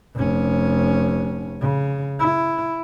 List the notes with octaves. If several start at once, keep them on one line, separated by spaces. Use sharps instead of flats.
F1 C#4
C#3
E4